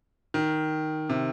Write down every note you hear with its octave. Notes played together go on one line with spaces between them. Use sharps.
D#3
C3